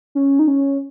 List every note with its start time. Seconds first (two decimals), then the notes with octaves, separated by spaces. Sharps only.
0.15 C#4
0.39 D#4
0.48 C#4